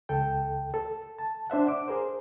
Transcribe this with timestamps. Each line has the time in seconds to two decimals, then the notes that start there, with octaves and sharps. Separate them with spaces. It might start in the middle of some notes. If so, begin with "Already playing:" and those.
0.09 C#2 A4 G5
0.74 A4
1.19 A5
1.50 D4 C5 E5 F#5
1.68 D6
1.88 G#4 A#4 C5